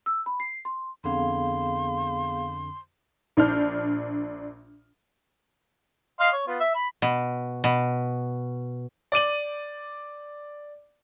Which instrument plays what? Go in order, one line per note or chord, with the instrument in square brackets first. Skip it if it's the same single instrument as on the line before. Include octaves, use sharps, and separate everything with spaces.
[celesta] E6
B5
C7
C6
[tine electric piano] F2 D3 C4 [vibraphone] B3 G#4 F5 [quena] C6
[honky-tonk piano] A#1 D4 F6 G6
[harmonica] D#5 F5 C6
C#5
B3 F4
E5
B5
[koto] B2
B2
[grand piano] D5 D6 D#7 F#7